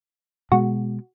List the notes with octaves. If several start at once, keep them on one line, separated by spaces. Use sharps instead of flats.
B2 G#3 F#4